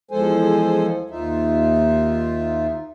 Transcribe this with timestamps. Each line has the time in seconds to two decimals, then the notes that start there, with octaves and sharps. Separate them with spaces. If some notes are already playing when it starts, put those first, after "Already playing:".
0.11 E2 F3 G#3 A4 C5 G#5
1.10 D#2 D#4 F4 E5